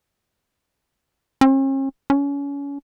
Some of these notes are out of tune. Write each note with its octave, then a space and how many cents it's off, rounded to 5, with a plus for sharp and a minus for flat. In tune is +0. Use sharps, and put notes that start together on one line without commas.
C#4 -45
C#4 +30